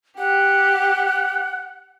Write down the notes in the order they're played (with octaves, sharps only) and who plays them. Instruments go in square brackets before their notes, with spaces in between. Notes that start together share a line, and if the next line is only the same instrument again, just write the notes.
[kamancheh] G4 [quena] F#5